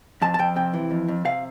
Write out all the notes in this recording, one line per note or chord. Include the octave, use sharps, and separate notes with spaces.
F2 A5
A5
F2 G5
C3 G5
E3
F2
F2
C3 F5